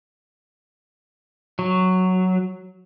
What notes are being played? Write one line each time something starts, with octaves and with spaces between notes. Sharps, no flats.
F#3